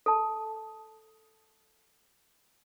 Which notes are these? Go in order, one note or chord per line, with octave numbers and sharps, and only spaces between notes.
A4 A5